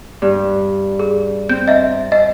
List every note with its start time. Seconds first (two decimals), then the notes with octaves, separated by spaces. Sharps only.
0.22 G2
0.99 G#4
1.49 C4 G6
1.68 D#5 E5
2.12 D#5